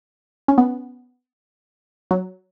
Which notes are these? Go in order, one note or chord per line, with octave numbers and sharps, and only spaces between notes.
C#4
B3
F#3